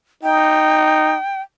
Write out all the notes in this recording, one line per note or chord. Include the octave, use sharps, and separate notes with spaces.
D#4 G5